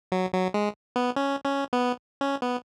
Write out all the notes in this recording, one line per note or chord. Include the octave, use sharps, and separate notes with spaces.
F#3
F#3
G#3
B3
C#4
C#4
B3
C#4
B3